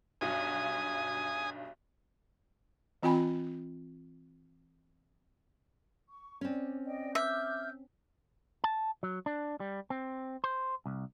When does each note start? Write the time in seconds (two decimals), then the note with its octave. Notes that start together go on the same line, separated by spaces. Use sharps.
0.21 B1 G2 F#4 G#5 D#6
3.03 E3 C4 F4 G5 G#5 B5
6.10 C#6
6.41 C4 C#4 D5
6.85 D5 D#5 G5
7.15 E5 D6 F6 G6
8.64 A5
9.03 F#3
9.26 D4
9.60 G3
9.90 C4
10.44 C5
10.86 C2